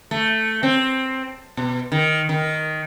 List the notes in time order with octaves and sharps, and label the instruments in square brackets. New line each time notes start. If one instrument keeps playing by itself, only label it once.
[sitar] A3
C4
B2
D#3
D#3